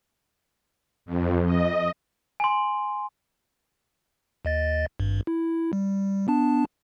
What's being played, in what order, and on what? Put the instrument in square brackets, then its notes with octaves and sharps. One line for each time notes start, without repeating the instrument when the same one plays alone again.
[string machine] F2
D#5
[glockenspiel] G#5 C6
[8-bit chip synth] D#2 D#5 A6
G#1 G2
E4
G3
B3 D4 A5